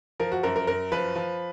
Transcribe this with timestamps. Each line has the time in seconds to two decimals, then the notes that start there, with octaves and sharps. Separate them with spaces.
0.20 F3 A#4
0.32 F#4
0.43 F#2 A#4
0.56 A#4
0.67 F#2 A#4
0.92 F3 B4
1.15 F3